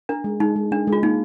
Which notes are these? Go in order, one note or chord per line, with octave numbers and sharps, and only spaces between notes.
D4 A#4
G#3
G#3 D#4
G#3
G#3 D4
G#3
F4
A#3 D#4